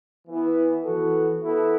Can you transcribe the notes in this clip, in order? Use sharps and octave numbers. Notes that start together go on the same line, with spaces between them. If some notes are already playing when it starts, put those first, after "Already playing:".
E3 B3 E4 B4
E3 B3 F#4 A4
B3 E4 A4